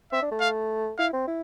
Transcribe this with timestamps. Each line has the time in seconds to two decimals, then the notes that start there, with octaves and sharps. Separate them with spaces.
0.12 C4 E5
0.22 D4
0.31 A3
0.41 F5
0.98 E4 F5
1.13 C4
1.27 E4